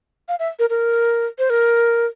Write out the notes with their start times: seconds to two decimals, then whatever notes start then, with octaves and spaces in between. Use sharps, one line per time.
0.29 F5
0.39 E5
0.59 A#4
0.70 A#4
1.39 C5
1.50 A#4